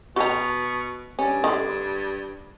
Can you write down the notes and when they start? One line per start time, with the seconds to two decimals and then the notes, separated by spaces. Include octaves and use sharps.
0.16 B2 F#4 A#5
1.19 G2 C#4
1.44 D3 D#3